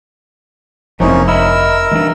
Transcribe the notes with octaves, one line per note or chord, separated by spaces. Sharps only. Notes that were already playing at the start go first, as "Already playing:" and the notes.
F1 G#2 F3 A#3 C4 C#4 D#4 E4
A#4 D#5 E5 B5 E6
E3 G#3 D4